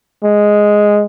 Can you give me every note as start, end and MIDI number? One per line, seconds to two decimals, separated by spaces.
0.24 1.05 56